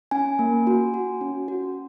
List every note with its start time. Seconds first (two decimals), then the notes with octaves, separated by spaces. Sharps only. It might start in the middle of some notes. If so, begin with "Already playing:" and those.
0.11 C#4 G#5
0.39 A#3
0.67 F#4
0.94 F#4
1.21 C#4
1.48 F#4